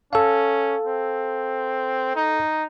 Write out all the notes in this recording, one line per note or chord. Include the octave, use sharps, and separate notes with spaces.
C#4 A4 F5
C4
D#4